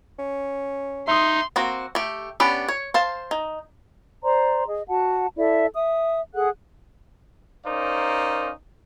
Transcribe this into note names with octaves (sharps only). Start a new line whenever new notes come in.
C#4
D#4 E5 C6 D#6
A#3 C4 F#4
A3 G4
B3 C#4 D4 G4 B4
C#5
C5 F5 A5
D#4
C5 D5 A#5 C6
G#4 D#5
F#4 F#5 A5
E4 A4 D5 E5
E5 D#6
G#4 A4 F#5 F#6
C#4 D#4 A#4 C5 D5 F5